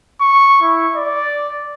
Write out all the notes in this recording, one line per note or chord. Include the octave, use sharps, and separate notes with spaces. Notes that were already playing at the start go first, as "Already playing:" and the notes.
C#6
E4
D5